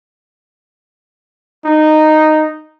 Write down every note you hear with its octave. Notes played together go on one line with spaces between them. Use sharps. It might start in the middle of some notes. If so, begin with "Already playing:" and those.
D#4